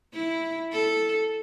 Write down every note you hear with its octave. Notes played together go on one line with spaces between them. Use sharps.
E4
A4